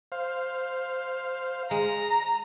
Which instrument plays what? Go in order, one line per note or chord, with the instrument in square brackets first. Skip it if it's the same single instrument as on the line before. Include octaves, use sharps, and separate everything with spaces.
[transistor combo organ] C5 F5
[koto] G#3 [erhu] A#5